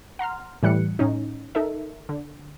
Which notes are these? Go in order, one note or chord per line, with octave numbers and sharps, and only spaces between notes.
F#5 A#5 C6 F6
A2 E3 G3 F#6 C#7
A2 C#4 D#4
D#4 A4 A#4 E5
D3